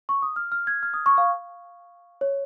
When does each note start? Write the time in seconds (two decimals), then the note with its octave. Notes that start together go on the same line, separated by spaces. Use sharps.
0.09 C#6
0.22 D#6
0.36 F6
0.52 F6
0.67 G#6
0.83 F6
0.94 D#6
1.06 C#6
1.18 F5
2.21 C#5